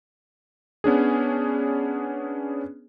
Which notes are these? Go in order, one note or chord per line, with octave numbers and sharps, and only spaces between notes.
B3 C#4 D4 G#4